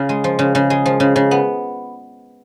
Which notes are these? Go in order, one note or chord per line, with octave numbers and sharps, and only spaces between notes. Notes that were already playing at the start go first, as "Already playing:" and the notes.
Already playing: C#3 F4
G#3
F3
C#3
C#3
G#3
F3
C#3
C#3
B3